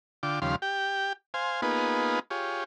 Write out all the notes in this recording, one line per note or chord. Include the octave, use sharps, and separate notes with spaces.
D3 F4 G5 D6
D#2 C#3 F3 G3 F5 C6
G4 G5
C5 F5 G#5
A#3 B3 D#4 F4 G#4 B4
F4 G4 G#4 C#5